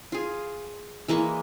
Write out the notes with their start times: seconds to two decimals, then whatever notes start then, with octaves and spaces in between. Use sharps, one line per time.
0.12 F4 G#4
1.08 E3 G#3 A#3 C#6